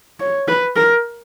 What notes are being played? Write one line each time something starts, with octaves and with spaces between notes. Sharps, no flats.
C#5
B4
A#4